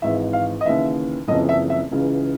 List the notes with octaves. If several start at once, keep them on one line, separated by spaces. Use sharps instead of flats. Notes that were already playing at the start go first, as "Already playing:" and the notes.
G#1 G#2 E3 E5
F5
D#5
D#2 C#3 E3 E5
F#1 F2 C#3 E3 D#5
E5
E5
C#2 C#3 E3